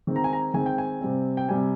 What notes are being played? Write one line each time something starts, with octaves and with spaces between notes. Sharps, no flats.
D#3 G#3 C4
A#5
G#5
A#5
D#3 G#3 C4 G#5
G5
G#5
C3 G3 C4
G5
C3 G3 C4 G#5